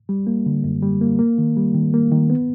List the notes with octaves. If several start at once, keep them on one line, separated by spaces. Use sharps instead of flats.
G3
A#3
D3
F#2
G3
A#3
A#3
D#3
G3
D#3
A#3
D#3
B3